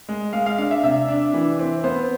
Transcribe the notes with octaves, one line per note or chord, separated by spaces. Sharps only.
G#3
G#3 F5
F5
D4 F5
E5
C3 E5
D4
E3
C4
B3 C5